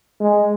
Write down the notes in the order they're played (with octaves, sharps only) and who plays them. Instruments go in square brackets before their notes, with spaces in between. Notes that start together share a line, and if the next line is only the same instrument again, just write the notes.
[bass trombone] G#3